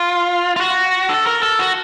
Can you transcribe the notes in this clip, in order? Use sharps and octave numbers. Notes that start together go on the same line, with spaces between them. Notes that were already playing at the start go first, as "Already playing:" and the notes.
Already playing: F4
F4
F#4
A4
A#4
A4
F#4